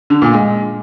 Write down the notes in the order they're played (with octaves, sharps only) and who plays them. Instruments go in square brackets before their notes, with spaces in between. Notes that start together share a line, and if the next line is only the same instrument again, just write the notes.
[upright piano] D3
A#2
G#3